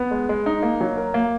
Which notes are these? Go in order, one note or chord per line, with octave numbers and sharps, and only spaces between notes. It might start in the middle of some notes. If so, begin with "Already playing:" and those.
Already playing: B3
G#3
G#3
D#4
A#3
F#3
A#4
A#3